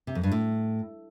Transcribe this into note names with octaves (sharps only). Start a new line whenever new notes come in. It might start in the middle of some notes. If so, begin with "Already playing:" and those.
C3
F2
G2
A2